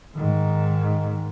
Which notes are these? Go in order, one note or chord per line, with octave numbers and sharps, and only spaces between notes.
G#2 D#3